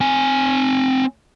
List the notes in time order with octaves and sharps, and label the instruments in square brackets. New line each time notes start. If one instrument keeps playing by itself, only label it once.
[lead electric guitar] C4 G#5